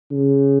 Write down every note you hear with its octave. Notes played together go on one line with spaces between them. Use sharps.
C#3